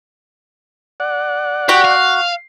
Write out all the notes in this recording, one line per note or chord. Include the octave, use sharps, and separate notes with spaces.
D5 F#5
F#4 G4
F5